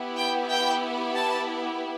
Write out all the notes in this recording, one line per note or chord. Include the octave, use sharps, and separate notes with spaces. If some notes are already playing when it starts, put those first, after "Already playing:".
Already playing: B3 E4 G4
G5
G5
A5